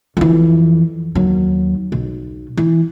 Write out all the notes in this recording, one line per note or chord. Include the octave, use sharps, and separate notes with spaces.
F2 E3
D#2 F#3
B1
E3